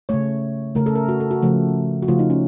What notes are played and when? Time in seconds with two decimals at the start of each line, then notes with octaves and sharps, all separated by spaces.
0.09 C#3 A3 C#5
0.75 C#3 A3 A#4
0.86 A4
0.95 A#4
1.09 F#4
1.20 A4
1.31 F#4
1.42 C#3 F3 A3
2.02 F#4
2.08 C#3 F3 A3 F4
2.19 D#4
2.30 C#4